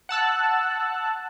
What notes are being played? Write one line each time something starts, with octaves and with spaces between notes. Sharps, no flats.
F#5 A5 E6 F#6